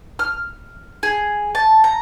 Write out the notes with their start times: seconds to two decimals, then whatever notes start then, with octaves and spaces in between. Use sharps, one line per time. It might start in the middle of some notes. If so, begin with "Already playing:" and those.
0.19 F6
1.03 G#4
1.55 A5
1.84 A#5